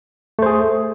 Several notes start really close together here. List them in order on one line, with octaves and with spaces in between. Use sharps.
A3 C5 G#4